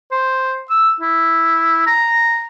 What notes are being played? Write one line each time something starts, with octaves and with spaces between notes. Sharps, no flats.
C5
E6
E4
A#5